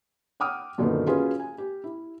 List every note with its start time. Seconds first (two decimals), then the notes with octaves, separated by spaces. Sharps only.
0.40 F#5 G5 D6 D#6 F6
0.78 F#2 A#2 D3 D#3 F#3 B3
1.07 C#4 F4 F#4 G#4 B4
1.40 G#5
1.58 G4
1.84 E4